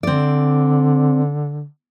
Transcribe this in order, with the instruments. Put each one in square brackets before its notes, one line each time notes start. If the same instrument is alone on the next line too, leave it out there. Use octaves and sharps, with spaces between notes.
[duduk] D3 [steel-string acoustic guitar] C4 D5